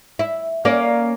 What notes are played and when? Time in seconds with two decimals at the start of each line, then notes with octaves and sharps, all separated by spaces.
0.19 E4
0.65 A#3 C#4 D5